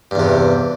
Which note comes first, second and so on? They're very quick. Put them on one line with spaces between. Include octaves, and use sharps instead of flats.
G2 E2 C3